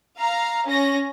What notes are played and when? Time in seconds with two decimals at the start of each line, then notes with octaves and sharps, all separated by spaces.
0.19 F5 A#5
0.67 C#4 A#6